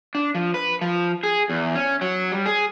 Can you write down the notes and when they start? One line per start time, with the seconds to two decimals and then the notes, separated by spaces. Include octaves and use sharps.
0.15 D4
0.35 F3
0.54 B4
0.81 F3
1.23 G#4
1.50 E2
1.75 C#4
2.01 F#3
2.32 G3
2.46 G#4